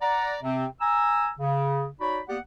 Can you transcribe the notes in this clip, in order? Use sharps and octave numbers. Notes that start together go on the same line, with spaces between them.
D5 F#5 A#5
C3 C4
G#5 A#5 E6
C#3
D#4 F#4 C#5 D5 B5
A#3 B3 G4 D5 F#5